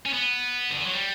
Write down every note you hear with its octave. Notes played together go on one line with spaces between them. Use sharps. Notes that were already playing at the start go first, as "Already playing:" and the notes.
C#4
B3
D3
E3
F#3
G3